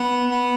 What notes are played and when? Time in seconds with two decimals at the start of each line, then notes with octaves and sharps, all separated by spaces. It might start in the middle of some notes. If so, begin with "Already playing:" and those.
Already playing: B3
0.31 B3